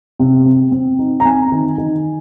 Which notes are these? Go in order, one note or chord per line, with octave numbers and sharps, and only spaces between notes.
C3
C4
C4
D#4
A#5
C4 G#5
D#3
D#3